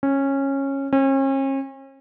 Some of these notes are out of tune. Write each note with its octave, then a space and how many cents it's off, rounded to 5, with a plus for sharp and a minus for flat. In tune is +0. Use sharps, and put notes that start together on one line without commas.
C#4 -15
C#4 -40